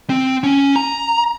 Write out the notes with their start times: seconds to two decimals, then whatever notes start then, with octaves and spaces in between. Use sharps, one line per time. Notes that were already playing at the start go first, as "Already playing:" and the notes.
0.10 C4
0.43 C#4
0.76 A#5